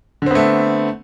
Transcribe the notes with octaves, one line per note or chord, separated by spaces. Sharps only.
D3 A3 B3 C4